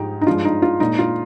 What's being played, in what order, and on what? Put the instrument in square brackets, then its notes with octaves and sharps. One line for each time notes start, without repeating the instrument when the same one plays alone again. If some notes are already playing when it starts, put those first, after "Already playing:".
Already playing: [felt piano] G#2 F3 G#3 D#4 G4
D#4
G2 F3 G#3 F4
D#4
F4
A#2 G#3 D#4
F4